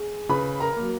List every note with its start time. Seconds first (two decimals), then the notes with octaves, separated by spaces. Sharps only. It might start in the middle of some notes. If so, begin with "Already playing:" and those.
Already playing: G#4
0.29 C#3 B4 B5
0.60 A#4 A#5
0.77 F#3 A#3